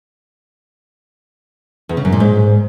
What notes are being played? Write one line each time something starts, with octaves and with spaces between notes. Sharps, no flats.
E2
C#3
F#2
A#2
G#2